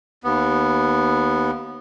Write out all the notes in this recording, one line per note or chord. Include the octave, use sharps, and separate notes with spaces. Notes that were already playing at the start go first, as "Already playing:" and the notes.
D#2 B3